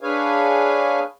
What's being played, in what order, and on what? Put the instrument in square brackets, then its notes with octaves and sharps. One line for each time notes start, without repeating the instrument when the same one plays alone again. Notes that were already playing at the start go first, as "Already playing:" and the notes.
[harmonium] D4 G#4 B4 C#5 F5 G#5